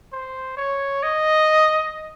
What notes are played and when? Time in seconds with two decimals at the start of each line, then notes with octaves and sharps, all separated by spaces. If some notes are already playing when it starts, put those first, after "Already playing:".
0.12 C5
0.57 C#5
1.03 D#5